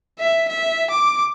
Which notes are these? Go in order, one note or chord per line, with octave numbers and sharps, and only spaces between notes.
E5
E5
D6